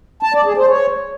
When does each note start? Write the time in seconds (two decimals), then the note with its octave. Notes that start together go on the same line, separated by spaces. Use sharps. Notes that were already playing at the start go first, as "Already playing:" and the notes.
0.23 A5
0.34 D5
0.46 G#4
0.57 C5
0.69 C#5